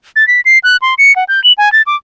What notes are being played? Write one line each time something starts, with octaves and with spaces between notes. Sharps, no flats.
A6
B6
C7
F#6
C6
C#7
F#5
G6
F#7
G#5
A6
D6